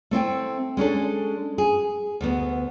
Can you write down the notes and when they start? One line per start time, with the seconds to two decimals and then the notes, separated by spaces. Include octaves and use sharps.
0.11 A3 C4 E4 G5
0.77 G#3 C#4 D4 A4
1.58 G#4
2.21 D2 B3